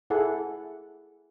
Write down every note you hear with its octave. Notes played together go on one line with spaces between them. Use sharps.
E4 G#4 A4 F#5 G#5